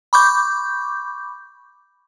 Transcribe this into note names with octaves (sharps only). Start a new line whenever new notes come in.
B5 C#6 D6 G6